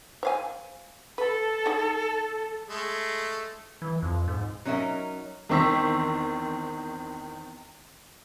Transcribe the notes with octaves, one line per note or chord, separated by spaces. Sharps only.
C5 F5 G#5
A4 B4
D#4 G#4
G#3 A3
E3
F2
G#2
F#3 C#4 D#4 A#4 E5
E2 D#3 C4 C#6 E6 B6